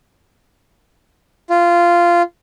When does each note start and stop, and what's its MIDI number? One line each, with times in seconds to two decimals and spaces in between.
1.50 2.22 65